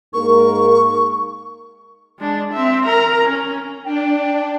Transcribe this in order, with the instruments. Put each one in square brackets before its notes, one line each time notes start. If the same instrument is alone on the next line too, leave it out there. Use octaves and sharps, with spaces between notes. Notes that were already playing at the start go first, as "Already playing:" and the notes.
[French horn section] G#2 A#3 A#4 [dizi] C#6
[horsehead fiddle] G#3 D4
C4 E5
A#4 A#5
C#4
[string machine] D4 [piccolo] G5